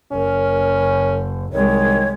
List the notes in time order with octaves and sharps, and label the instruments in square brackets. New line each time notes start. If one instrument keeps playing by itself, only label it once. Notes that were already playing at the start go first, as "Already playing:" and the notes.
[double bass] F#1 [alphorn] C#4 [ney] A#4
[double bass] C2 G#3 [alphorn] D#3 [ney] C#5